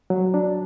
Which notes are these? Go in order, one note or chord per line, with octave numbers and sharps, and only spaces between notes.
F#3
D4